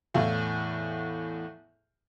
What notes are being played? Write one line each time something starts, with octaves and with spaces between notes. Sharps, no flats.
E2 A2 E4 F5